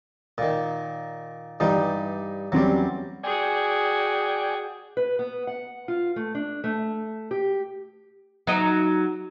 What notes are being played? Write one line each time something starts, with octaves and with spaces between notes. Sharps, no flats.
A#2 D#3
G2 E3 G3 D#4
E2 F#3 G3 C4 C#4
F#4 G#4 D5 G5 G#5
B4
B3
F#5
F4
A3
D4
A3
G4
F#3 D#4